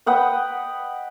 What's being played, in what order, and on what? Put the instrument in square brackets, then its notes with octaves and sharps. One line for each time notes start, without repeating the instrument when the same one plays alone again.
[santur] B4 D#5 F#5 G5